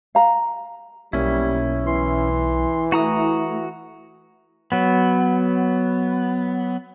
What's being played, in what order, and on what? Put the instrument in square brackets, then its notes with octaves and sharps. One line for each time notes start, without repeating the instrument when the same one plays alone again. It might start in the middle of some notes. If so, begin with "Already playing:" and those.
[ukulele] F5 A#5
[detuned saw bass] B1 [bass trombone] G3 [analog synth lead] A#3 [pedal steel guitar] C#4 E4
[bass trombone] E3 [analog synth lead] C6
[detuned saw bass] A3 [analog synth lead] E4 [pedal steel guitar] F#4 A#5 D#6
[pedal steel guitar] F#3 B3